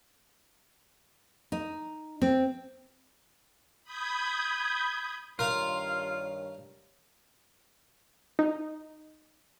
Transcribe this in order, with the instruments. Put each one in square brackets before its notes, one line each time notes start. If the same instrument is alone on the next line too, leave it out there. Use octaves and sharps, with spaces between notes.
[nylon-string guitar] D#4
C4
[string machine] B5 D#6 G6 G#6
[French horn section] G2 D#3 C#5 [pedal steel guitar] F4 [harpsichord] A#4 F5
[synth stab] D#4